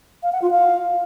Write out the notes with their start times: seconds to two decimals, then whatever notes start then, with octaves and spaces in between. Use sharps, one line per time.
0.23 F5
0.32 F#5
0.42 F4
0.51 F5